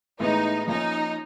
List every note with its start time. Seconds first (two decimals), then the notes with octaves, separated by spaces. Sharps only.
0.20 A2 E3 G#3 B3 D#4
0.67 F3 A#3 C#4 D#4